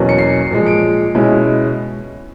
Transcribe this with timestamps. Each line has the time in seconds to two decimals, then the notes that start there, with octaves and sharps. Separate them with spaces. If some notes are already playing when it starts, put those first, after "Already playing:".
Already playing: E2 B2 F#3 A#3 C#4
0.09 C#7
0.18 C7
0.51 A#2 F3 G#3
0.66 D7
1.15 B2 G#3 C#4 E4